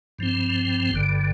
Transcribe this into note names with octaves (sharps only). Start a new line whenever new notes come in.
G2 F3 C4
G1 G2 D3